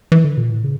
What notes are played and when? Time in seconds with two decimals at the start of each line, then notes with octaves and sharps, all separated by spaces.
0.12 E3
0.24 D3
0.37 A#2
0.51 A2
0.64 C#3